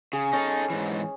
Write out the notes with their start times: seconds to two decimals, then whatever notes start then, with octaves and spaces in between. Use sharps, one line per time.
0.13 C#3 G#4
0.33 C#4 D#4 A4
0.70 G#2 E3